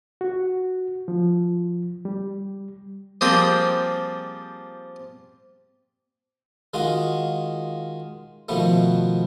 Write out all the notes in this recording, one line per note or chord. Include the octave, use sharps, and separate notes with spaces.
F#4
F3
G3
F3 G3 A#3 C4 G#4 G5
D#3 G#3 F4 F#4
B2 D#3 F3 A3 B3